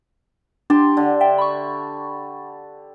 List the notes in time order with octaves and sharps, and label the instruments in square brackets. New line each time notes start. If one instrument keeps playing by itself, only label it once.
[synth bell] D4 [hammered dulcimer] G4 A5 C6
[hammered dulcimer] D3
[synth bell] E5 G5
B5 C#6